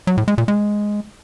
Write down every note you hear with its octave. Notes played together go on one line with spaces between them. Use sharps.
F#3
A2
G#3
A#2
G#3